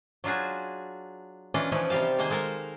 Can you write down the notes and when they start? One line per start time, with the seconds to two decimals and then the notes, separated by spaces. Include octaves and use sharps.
0.24 F#3 D4 F4 F#4 G#4
1.54 E3 C#4 D4 F4 D5 D#5
1.72 E3 F3 C#4 D#4 E4
1.90 C3 G3 G4 F5 A5
2.18 D#3 G#3 A#3 G#4 C5
2.30 G#3 A4 A#4